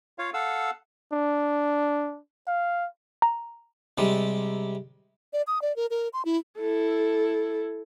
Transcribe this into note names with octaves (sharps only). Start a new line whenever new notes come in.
F4 C#5 F5
A4 F5 F#5 E6
D4
F5
A#5
C3 G3 G#3
D5
D#6
D5
A#4
A#4
C6
E4
E4 A4